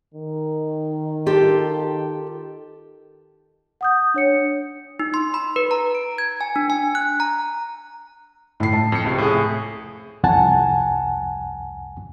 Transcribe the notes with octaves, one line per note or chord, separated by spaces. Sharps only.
D#3
F4 G4 A4
F#5 D#6 G6
D4 C#5 C#7
D#4
C6
B5
B4
A#5
D7
G#6
G#5
D4
G#5
F#6
A#5
A2 C7
A5
F2 C#7
C#2 C3 C7
A2 G#4
C2 F2 F#5 G#5 A5